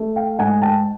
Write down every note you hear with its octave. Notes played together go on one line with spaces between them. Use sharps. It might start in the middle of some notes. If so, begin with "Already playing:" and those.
Already playing: A3
F5 G5
G#2 F#5 G#5
G5 A5